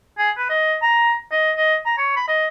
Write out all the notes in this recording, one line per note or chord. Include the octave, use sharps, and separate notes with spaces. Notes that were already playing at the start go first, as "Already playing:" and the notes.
G#4
B4
D#5
A#5
D#5
D#5
A#5
C#5
B5
D#5